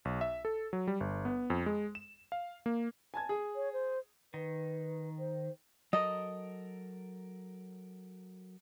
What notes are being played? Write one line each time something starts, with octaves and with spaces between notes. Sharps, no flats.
B1
E5
A4
F#3
G3
G1
B3
F2
G#3
E7
F5
A#3
G#5 A5 G#6
G#4
C#5
C5
D#3 B4
C5
F#3 A4 A#4 D#5